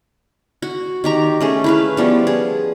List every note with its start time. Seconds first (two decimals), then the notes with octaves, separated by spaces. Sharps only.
0.62 F#4
1.04 D#3 G4 A#5
1.40 A3 C#4 G#4
1.64 E4 B4 F5
1.97 F3 G3 B3
2.27 G#4